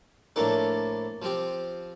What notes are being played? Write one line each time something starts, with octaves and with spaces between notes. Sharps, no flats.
A2 F3 A#3 D4 A4
F3 C4 G4